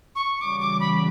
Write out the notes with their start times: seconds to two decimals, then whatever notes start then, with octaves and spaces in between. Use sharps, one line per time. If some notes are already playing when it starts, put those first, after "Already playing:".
0.16 C#6
0.41 C#3 E3 G3 C#4 F#4 D6
0.60 D6
0.80 B5